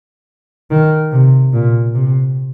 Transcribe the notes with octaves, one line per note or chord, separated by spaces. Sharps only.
D#3
C3
A#2
C3